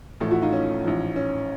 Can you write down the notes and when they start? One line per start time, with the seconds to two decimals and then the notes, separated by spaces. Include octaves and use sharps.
0.20 A1 A2 F3 A3
0.31 E4 F#4
0.42 D#4 F4
0.52 C#4
0.84 A1 G#2 F3
1.16 C#4